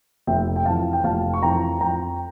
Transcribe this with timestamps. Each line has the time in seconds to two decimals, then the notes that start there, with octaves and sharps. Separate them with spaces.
0.27 F1 E5 G5
0.56 G5
0.66 F2 E3 F5 A5
0.93 G5
1.04 F1 F5 A5
1.34 C#6
1.43 F2 E3 G5 A#5
1.81 F2 G5 A#5